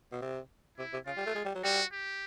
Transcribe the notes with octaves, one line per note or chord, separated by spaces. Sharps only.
B2
C3
C3 E4
C3
C#3 F4
G3
A3
G#3
G3
F#3
G3 F#4
G4